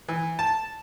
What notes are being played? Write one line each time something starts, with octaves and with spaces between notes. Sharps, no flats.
E3
A5